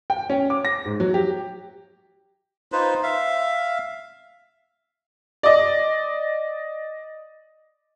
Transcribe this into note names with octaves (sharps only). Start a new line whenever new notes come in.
G5
C#4
D6
A#6
G#2
F#3
G4
D#4 F4 B4 C5
E5 F5
D5 D#5